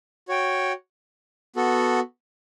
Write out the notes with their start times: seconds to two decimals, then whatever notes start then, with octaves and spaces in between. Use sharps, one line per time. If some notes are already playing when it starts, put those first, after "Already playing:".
0.28 F#4 C#5 G5
1.56 B3 F#4 A4